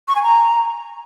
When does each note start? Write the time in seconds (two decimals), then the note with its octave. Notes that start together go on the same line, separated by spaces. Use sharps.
0.08 C#6
0.16 G#5
0.23 A#5